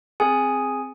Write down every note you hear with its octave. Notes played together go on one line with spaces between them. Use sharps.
C4 G#4 G#5